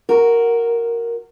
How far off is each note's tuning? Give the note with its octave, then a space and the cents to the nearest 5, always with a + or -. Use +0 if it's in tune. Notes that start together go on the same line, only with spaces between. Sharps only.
F#4 +0 A#4 +0